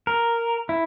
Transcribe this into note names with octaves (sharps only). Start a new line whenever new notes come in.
A#4
E4